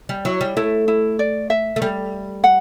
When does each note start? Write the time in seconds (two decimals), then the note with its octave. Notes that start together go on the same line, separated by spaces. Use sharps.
0.09 G3
0.25 F#3 E4
0.41 G3
0.57 A3 E4
0.88 E4
1.19 D5
1.50 E5
1.76 A3
1.82 G3
2.44 F#5